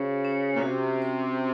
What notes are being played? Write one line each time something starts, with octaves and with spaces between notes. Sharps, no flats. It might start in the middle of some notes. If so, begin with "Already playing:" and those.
Already playing: C#3 C#4 F#4 C5
C#4
A#2
C3 F#4
C5